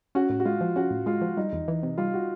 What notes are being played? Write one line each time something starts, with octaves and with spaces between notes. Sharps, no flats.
C#4 F#4
A2
F#4
G#3 F4
F3
C#4 F#4
A2
G#3 F4
F3
G3 D#4
E2
E3
C3
G3 F4
F#4